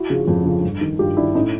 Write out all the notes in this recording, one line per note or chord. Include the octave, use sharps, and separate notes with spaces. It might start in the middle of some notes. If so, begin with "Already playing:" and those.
Already playing: E4 F#4
C#3 F3
F2
C#3 F3
G2
D#3
G2 F4 G4
D#3 D4 E4
A2 C#4 D#4